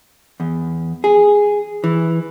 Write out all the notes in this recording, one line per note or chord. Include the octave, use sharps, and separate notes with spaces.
E2
G#4
E3